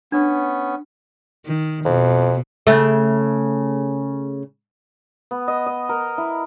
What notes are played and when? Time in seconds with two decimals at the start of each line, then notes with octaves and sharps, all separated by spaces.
0.12 B3 C#4 D4
1.46 D#3
1.85 F2 B2
2.67 C#3 A3
5.31 B3
5.48 D#5
5.66 D#5
5.89 A#4
6.18 E4